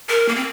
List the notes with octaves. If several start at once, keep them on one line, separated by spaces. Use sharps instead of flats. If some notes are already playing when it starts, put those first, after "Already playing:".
A#4
A#3
C4